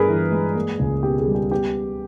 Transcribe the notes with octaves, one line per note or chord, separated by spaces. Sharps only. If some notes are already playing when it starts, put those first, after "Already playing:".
Already playing: G2 B3 G#4 A#4 B4
E3
G#3
A#3
C#2
B2 G4
G#4
G3
G4
B3 G4